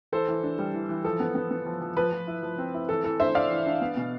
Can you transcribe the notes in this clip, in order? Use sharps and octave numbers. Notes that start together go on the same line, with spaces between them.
E3 A4 C5
E3
D4
G3
E3
E3
F3 A4
B3
B3
B3
F3
F3
F3 B4
F3
E4
F3
C4
E4
E3 A4
E3 A4
D4 C5 E5
D4 D5 F5
E3
D4
B3
B2